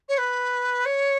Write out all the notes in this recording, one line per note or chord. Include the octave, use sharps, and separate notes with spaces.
C#5
B4
C#5